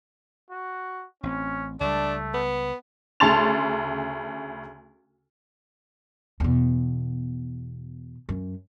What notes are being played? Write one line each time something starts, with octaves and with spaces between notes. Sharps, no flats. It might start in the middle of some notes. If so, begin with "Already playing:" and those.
F#4
A1 C4 C#4
C#2 G3 A3 D4
B3
D2 C#3 A5 C6 A6 F7
E2 B2
F#2